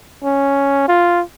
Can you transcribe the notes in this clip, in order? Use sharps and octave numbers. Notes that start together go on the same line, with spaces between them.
C#4
F4